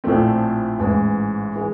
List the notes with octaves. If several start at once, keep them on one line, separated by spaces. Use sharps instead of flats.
A#1 A2 F3 A3 C4
A1 G#2 E3
E3 G#3